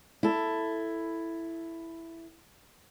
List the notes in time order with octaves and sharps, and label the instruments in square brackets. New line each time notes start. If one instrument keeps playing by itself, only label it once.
[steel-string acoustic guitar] E4 A4